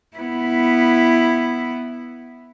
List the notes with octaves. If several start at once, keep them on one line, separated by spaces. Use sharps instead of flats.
B3 E4